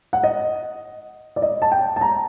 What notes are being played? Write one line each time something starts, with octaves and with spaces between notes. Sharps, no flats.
F#5
D#5
D5
D#5
A5
G5
A5
A#5